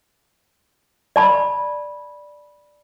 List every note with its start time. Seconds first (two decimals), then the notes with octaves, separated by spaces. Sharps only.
1.16 D5 A5 B5